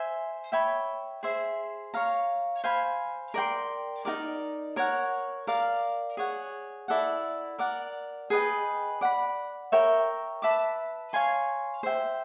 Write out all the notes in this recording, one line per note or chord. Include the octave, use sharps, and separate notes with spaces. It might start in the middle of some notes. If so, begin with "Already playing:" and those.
Already playing: C5 E5 G#5
C#5 E5 G5 B5
G#4 C5 E5
C#5 F5 A#5
C5 F5 G#5 B5
A#4 D5 G5 C6
D#4 F#4 A#4 D5
A#4 C#5 F#5
A#4 D5 F5
G#4 C#5 F#5
E4 A4 D5 F#5
A#4 D5 F#5
G#4 B4 D#5 G5
D5 F#5 B5
A#4 C#5 E5 G5
B4 E5 A5 D6
C#5 F5 G#5 C6
C5 E5 G5